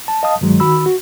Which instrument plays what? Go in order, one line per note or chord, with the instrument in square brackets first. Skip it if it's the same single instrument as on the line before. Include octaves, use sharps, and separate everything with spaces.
[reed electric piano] A5
D#5 F5 A5 D#6
G2 D#3 F#3 G#3
D#3 F#4 B5 E6
F#4